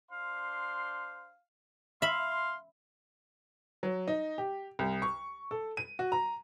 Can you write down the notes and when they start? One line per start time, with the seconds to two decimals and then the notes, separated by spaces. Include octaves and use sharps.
0.11 D4 C5 F5 C6
2.02 E5 F5 B5 C6
3.83 F#3
4.08 D#4
4.38 G4
4.79 C2
5.02 C#6
5.51 A4
5.77 D#7
5.99 F#4
6.12 A#5